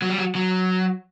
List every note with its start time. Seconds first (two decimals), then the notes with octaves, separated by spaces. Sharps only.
0.02 F#3
0.10 G3
0.18 F#3
0.35 F#3